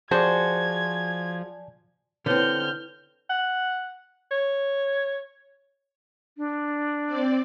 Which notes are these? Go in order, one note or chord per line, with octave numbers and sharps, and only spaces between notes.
F3 F#4 G#4 C5 D5 G#5 A5 G#6
D3 C4 E4 B4 C#5 F6 G6
F#5
C#5
D4
C4 D5